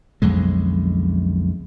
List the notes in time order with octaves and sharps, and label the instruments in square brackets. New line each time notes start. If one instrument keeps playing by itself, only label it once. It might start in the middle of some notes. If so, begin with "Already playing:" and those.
[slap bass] B1 F2 D3 G#3